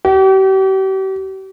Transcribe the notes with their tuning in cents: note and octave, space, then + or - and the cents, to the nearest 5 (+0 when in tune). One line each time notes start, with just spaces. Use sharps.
G4 -40